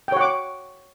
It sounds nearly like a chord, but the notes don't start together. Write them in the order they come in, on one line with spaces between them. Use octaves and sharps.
G5 C#5 F#5 D6